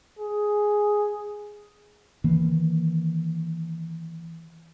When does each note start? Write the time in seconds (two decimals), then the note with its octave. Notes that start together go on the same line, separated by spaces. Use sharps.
0.19 G#4
2.24 D#3 E3 A#3